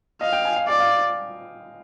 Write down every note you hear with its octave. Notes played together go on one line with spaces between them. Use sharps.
D#5 F5
G5
G#5
F5
D5 F5
F5